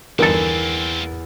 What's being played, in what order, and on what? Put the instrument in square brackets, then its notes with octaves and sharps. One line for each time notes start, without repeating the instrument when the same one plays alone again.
[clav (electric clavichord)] G1 A4 [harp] E2 [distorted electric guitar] A#3 C4 [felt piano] A#4 A6